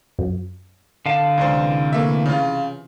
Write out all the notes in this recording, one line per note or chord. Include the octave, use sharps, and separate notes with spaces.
F#2
D3 F5 A5
C#2 C3 E3 D4 C5
A3 A#3 E5
C#3 F4